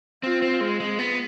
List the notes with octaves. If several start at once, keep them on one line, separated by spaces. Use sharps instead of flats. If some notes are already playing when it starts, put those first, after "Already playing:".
C4 F4
C4
G#3
G#3
B3